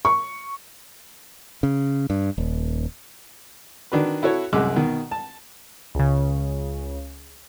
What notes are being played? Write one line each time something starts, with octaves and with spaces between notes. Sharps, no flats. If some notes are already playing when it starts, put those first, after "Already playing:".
C#6
C#3
G2
D#1
D#3 D4 F#4 B4
E4 F#4 A4 C#5
C2 F#2 G#3 D6 E6 F#6
B2 D#3
A5
C#2 C#3